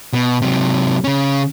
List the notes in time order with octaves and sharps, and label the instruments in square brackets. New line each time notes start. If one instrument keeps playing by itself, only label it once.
[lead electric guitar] B2
C3 F#3
C#3 C#4